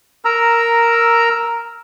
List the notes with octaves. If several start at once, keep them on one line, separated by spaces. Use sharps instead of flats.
A#4 A#5 E6